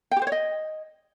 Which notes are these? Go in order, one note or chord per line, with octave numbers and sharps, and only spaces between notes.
G5
G4
C5
C#5
D#5